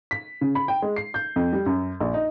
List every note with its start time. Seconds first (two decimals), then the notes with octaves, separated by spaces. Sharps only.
0.11 B6
0.41 C#3
0.55 B5
0.68 G5
0.82 G#3
0.96 C7
1.14 G6
1.36 F2
1.53 G3
1.66 F#2
2.01 A#1
2.14 D#4